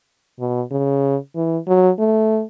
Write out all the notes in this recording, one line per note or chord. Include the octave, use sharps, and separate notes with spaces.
B2
C#3
E3
F#3
A3